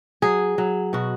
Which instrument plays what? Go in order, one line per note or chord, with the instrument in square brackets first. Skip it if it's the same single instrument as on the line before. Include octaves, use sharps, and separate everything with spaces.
[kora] F#3 G#4
F#3
B2 F#4